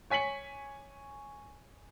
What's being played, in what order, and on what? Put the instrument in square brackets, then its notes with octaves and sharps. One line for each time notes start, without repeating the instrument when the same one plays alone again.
[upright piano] C#5 G#5 B6 C#7 F#7